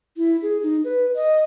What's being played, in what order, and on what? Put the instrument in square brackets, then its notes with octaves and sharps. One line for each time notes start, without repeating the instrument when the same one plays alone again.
[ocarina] E4
G#4
D#4
B4
D#5